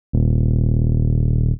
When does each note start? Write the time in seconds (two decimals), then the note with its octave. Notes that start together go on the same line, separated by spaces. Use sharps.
0.13 D#1